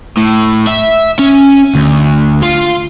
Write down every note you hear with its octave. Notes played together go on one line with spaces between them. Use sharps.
A2
E5
C#4
D2
F4